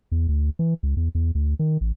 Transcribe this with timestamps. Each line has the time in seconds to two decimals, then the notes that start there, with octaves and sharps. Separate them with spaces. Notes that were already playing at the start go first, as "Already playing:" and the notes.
0.12 E2
0.28 D2
0.59 E3
0.83 C#2
0.97 E2
1.15 E2
1.35 D2
1.59 D#3
1.81 A1